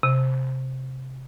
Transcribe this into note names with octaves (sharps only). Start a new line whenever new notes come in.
C3